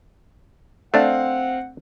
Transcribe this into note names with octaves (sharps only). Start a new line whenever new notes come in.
A3 C4 D4 F5 F#5